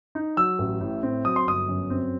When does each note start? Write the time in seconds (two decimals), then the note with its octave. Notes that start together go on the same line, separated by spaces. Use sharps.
0.15 D#4
0.37 F#3 E6
0.59 A1
0.81 A2
1.03 C4
1.25 F#3 D#6
1.36 C6
1.47 G1 D#6
1.68 F#2
1.90 C4